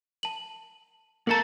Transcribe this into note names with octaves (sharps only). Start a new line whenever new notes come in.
A5 F#7
A#3 A4 A#4 A5 A#5